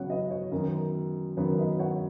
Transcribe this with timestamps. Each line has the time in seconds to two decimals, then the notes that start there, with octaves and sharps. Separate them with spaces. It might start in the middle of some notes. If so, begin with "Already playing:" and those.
Already playing: C#3 F#3 B3 C#5 F#5
0.09 B4 D#5
0.31 C#5
0.52 F#2 D#3 F#3 B3
1.37 F#2 D#3 F#3 B3 C#5
1.58 B4 D#5
1.79 C#5 F#5